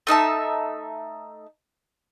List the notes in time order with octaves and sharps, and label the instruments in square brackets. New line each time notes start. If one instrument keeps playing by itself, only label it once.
[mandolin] A3 D#4 E5 A5